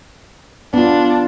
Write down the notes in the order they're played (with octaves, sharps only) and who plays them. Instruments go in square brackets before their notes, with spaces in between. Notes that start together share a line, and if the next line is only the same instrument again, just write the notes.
[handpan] B3 F4 [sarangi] D4